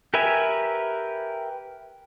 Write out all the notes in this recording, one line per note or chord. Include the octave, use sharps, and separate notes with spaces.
G4 A#4 B4 E5 G#5